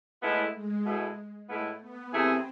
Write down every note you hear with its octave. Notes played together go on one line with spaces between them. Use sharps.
A2 G#3 A3 B3 E4
G#3
B2 A3 E4 G#4
A2 G#3 A3 B3 E4
B3
C3 E3 A3 C4 E4 G#4